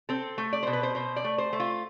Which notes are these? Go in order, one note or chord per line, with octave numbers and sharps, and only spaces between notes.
C4 A4
A3
D5
B2 C5
B4
C5
B2 C5
D5
A3
C5
A3
F4